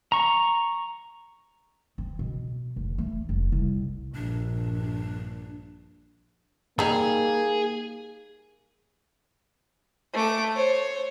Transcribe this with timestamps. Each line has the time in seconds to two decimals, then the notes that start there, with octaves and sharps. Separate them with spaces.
0.12 A#5 C#6
1.98 C4
2.19 B2
2.76 F1
2.98 A3
3.29 F1
3.52 C2
4.15 A#1 G2 D4
6.79 G3 A#3 D#4 G#4
10.13 A3 D6
10.55 C5 C#5